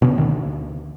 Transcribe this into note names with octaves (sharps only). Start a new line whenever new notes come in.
B2 D3 C#4
D2 D#3